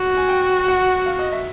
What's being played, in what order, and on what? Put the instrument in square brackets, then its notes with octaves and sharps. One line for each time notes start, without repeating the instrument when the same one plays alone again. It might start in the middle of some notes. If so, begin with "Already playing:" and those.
Already playing: [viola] F#4
[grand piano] G#5
G5
F#5
F5
D#5
E5